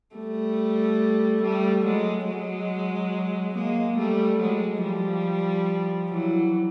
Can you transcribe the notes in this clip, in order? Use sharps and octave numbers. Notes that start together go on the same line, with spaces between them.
G3 A3
G3 A3
F#3 G#3
F#3 G#3
G#3 A#3
G3 A3
F#3 G#3
F3 G3
E3 F#3